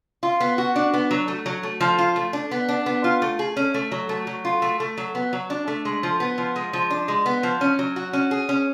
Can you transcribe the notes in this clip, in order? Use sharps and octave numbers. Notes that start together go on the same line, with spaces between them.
F4
B3
F#4
D4
B3
F#3
A3
F#3
A3
F3
F4
A3
D4
B3
D4
B3
F4
A3
G#4
C#4
A3
F#3
A3
F#3
F4
A3
A3
F#3
B3
F#3
D4
A3
G#3
F3
B3
F3
G#3
F3
D4
G#3
B3
F3
C#4
F#3
F#4
C#4
G#4
C#4